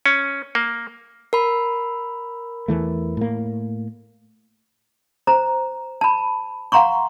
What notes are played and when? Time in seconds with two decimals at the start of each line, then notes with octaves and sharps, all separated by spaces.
0.06 C#4
0.55 A#3
1.33 A#4 B5
2.68 E2 E3 A3
3.17 A2 A#3
5.27 C5 A#5
6.01 A5 B5
6.72 F5 F#5 A#5 C6 C#6